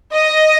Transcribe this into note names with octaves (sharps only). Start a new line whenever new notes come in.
D#5